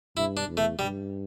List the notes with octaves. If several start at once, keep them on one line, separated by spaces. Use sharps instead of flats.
G2 E4
D4
E2
A3
G2 G3